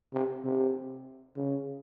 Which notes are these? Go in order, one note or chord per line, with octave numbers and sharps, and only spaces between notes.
C3
C3
C#3